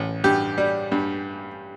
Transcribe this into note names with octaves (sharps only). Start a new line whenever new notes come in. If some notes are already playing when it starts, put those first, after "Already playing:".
Already playing: A1
G2 G4
G3
G2